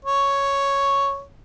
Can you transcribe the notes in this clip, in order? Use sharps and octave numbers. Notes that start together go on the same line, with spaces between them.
C#5